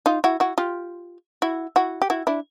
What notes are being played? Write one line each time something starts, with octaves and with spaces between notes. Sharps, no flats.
D#4 F4
E4 F#4
E4 F#4
F4 G4
E4 F#4
E4 F#4
G4
E4 F#4
D4 E4